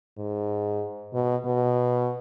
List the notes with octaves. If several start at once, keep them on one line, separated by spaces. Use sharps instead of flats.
G#2
B2
B2